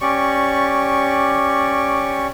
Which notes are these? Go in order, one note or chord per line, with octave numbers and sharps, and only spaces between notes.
C#4 G4 D5 C#6